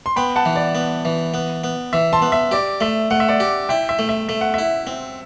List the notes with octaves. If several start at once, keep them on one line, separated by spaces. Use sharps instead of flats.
C6
B3 G5 B5
F#5 A5
E3
D5
B3
E3
B3
B3
E3 E5
A5 C6
B3
E5
G4 D5
A3 E5
A3 F#5
E5
D5 F#5
G4
E4 E5 G5
E5
A3
E5
A3 E5
F#5
E4 E5
C4